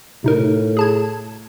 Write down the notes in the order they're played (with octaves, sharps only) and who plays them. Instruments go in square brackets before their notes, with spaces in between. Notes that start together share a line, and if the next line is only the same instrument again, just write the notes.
[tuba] A2 [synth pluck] C3 D#4 A#4
[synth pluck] G#4 A5 G#6